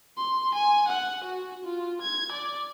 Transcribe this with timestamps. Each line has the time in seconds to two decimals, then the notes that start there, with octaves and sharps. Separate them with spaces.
0.17 C6
0.55 G#5
0.88 F#5
1.24 F#4
1.64 F4
2.01 G#6
2.32 D5